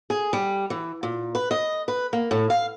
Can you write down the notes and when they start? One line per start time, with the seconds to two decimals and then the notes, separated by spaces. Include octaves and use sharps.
0.10 G#4
0.33 G3
0.70 E3
1.03 A#2
1.35 B4
1.51 D#5
1.88 B4
2.13 A#3
2.31 A2
2.50 F5